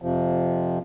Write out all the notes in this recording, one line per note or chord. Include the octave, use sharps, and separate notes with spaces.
F2 C3 F3